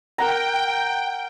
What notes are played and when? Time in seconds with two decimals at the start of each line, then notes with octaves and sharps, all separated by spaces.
0.18 A#4 F#5 G5 A#5